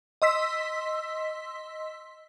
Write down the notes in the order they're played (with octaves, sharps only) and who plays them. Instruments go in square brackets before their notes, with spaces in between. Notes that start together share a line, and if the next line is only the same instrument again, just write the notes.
[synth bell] D#5 C6 E6 B6